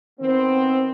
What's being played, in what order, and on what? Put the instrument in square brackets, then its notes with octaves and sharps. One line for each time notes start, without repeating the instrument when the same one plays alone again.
[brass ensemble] D#3 B3 C4